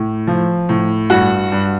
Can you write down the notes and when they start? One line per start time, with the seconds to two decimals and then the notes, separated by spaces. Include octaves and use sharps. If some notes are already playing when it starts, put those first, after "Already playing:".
Already playing: A2
0.27 F3
0.69 A2
1.10 G2 F#4 F#5
1.52 G2